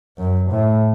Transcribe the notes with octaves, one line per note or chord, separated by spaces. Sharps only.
F#2
A2